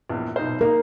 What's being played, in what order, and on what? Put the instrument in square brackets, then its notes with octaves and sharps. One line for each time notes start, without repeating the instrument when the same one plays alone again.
[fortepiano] A#1 E2
B1 D#4 C5
[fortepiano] A#3 D#4 [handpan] A#4